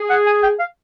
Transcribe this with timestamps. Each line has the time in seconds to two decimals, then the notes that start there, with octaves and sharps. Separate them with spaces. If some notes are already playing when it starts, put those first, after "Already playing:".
Already playing: G#4
0.10 F#5
0.27 G#5
0.43 G5
0.59 F5